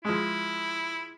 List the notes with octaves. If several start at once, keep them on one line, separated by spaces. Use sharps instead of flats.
F3 G#3 E4